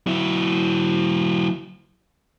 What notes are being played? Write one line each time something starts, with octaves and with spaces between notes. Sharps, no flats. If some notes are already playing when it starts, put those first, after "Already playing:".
F#3 E4